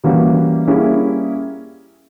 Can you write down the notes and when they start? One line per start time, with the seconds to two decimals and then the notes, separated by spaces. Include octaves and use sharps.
0.04 E3 G3 A#3 C#4 F#4
0.67 G3 A#3 C#4 E4 G#4